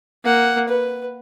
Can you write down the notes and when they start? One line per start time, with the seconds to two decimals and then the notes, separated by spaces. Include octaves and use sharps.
0.24 A#3 F#5
0.68 B4